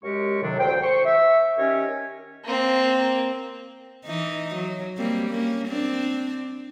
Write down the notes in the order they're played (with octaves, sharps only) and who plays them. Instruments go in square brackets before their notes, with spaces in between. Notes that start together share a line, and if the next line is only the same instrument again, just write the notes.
[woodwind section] F#2 G#3 G4 A#4 C#6
A2 C3 D#3 F#3 D4
D2 C5 G5
C5 C#6
E5
D#3 C#4 G4 A#4 C#5
[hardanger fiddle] A#3 C4
[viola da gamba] E3 D#4
F#3
G3 A#3 C4
A#3 C#4
C4 D4